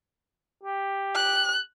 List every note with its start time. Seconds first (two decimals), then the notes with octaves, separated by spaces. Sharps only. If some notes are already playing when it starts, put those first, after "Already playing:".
0.63 G4
1.15 F#6